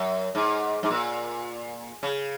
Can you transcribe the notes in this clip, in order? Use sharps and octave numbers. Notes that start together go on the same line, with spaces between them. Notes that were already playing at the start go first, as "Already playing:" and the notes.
Already playing: F#2
G#2
G#2
A#2
C#3